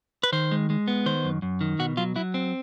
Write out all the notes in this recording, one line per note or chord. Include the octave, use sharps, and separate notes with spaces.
B4
D#3 C5
G#3
G#3
B3
D#3 C5
F#2
F#2
D#3
B2 F#4
F#3 F4
F#3 E4
C4